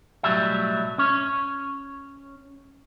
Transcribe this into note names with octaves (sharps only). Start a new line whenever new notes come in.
B1 A2 F#3 G3 E5
C#4 C#5